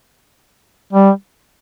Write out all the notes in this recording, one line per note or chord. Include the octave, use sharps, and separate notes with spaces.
G3